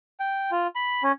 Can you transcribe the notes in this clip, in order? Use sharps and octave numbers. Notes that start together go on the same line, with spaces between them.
G5
F4
B5
C#4